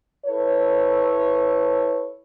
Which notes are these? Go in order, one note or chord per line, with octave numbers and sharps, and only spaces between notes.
E4 A4 B4 C#5